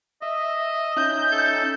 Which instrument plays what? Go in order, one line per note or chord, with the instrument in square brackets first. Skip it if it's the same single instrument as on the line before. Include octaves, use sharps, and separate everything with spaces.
[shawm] D#5 [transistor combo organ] E5
[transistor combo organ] C#4 D#4 E5 [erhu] G6
[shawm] A4